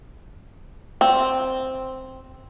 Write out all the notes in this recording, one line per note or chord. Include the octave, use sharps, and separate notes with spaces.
C4